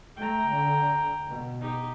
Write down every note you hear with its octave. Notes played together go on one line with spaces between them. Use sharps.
A3 G5 A#5
D3
B2
D#4 G4